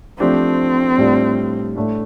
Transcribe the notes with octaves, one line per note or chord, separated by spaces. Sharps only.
F3 A3 C4 D4 G4
A2 G3 D4 F4
A2 A3 D4